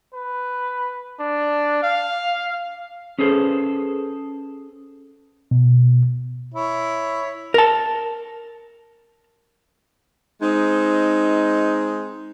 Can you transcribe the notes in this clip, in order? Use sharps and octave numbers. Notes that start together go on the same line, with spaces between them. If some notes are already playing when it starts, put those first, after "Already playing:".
B4
D4
F5
C#4 G#4 A4 B4 C5
B2
E4 C#5
A#4 A5
G#3 C4 D#4